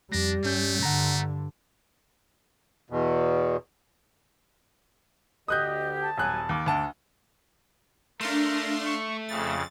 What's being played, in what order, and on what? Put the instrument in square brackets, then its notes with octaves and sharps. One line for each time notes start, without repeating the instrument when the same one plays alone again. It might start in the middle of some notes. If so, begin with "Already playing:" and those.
[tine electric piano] F2 A#6 [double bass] G3 [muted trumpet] D4
[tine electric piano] G2 C#4 G6 [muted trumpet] A3
[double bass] G2 D3 [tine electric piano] F#5 A#5
[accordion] E2 B2
[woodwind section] D2 D3 G4 [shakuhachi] D#5 [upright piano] D#6 F#6 G6
[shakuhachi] A5
[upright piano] D#1 F#6 [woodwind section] F#3 G#5
[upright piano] D#2 [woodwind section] D6
[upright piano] D2 A5 [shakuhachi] F#5
[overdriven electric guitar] A3 [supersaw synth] D4 F5 C6 [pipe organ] A#4
[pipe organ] C#6
[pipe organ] F2 C#3 [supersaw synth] A6